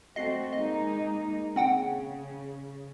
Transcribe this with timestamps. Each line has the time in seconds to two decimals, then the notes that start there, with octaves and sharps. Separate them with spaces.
0.16 A3 C4 F#4 D#5 C7
0.52 G#3 A#3 D#4 D#5
1.56 C#3 C4 F#5 G5